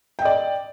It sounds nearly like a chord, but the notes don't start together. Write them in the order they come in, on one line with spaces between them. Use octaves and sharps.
G5 D#5 D5